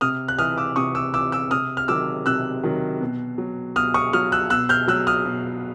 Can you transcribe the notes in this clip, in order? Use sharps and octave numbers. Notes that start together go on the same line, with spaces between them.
C3 D#6 F6
F#6
E3 D#6 F6
D6 E6
C3 C#6 D#6
D6 E6
E3 D6 E6
D6 E6
C3 D#6 F6
F6
D#3 F#3 D6 E6
C3 E6 F#6
D#3 F#3
B2
F#3
B2 D#6 F6
C#6 D#6
F#3 D#6 F6
E6 F#6
B2 E6 F#6
F6 G6
F#3 E6 F#6
D#6 F6
B2